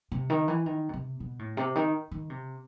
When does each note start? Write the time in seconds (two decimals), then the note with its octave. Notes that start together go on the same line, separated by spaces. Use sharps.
0.12 C3
0.30 D#3
0.48 E3
0.66 D#3
0.89 B2
0.94 C3
1.20 B2
1.39 A2
1.57 C3
1.75 D#3
2.11 D#3
2.30 C3